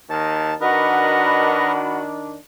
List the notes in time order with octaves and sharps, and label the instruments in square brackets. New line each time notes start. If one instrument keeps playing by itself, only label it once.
[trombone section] D#2 D#3 [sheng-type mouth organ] A5
[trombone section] D#3 D4 [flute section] F#4 F#5 B5 [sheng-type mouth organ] A#4 B4 D#5